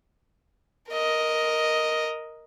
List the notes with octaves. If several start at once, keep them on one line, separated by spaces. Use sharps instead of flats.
A#4 D#5